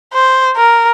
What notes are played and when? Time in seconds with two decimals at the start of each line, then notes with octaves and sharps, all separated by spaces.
0.13 C5
0.57 A#4